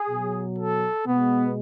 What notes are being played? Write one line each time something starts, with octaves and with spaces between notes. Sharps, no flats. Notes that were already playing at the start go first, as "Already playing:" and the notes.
Already playing: G#4
B2 F#3
A4
B2 G#3 B3